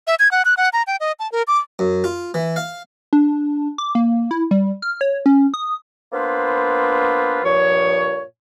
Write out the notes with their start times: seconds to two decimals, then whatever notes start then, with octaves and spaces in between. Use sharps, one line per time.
0.07 E5
0.19 G#6
0.31 F#5
0.45 F#6
0.57 F#5
0.73 A#5
0.87 G5
1.00 D#5
1.19 A5
1.32 A#4
1.48 D6
1.79 F#2
2.04 F4
2.34 E3
2.56 F5
3.13 D4
3.78 D6
3.95 A#3
4.31 E4
4.51 G3
4.82 F6
5.01 C#5
5.26 C#4
5.54 D#6
6.12 A#3 B3 D4 F4 B4 C5
7.43 G2 A#2 F3 C#5